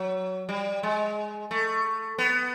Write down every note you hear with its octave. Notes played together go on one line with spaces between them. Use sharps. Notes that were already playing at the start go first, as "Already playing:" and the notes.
Already playing: F#3
G3
G#3
A3
B3